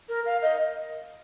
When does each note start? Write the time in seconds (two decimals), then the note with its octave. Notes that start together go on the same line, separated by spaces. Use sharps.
0.09 A#4
0.25 F5
0.42 D#5